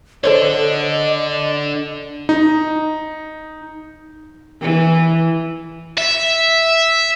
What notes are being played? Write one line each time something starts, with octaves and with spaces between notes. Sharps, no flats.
D3 D4 A4 C5 C#5 D#5
D#4
E3
E5